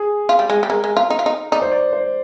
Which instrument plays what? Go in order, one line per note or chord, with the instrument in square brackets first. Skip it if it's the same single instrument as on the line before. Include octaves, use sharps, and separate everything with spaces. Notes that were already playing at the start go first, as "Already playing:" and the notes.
Already playing: [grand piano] G#4
[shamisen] F4
G3
G#3
G3
[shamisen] G#3 [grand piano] A#4
[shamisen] G#3
F4
D#4
F4
D#4
[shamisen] D#4 [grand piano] D5
[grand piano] C5
D5
C5